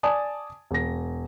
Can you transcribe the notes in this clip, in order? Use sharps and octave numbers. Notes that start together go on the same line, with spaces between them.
D5 G#5 A5 D#6
E1 A#6